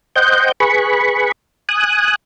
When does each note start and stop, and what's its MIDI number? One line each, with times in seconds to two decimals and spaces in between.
0.16 0.52 72
0.16 0.52 75
0.16 0.52 78
0.16 0.52 79
0.16 0.52 91
0.60 1.32 68
0.60 1.32 71
0.60 1.32 83
0.60 1.32 85
1.69 2.16 80
1.69 2.16 87
1.69 2.16 90